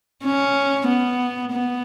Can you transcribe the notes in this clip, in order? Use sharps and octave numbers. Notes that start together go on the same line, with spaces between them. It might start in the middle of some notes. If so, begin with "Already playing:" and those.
C#4
B3
B3